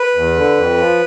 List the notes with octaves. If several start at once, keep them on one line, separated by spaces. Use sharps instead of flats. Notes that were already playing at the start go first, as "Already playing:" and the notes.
Already playing: B4
E2
D3
F2
F3